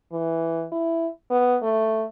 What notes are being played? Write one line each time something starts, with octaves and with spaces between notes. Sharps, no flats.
E3
E4
B3
A3